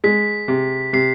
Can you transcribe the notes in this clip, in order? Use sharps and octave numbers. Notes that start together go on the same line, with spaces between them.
G#3 B6
C3
C3 C7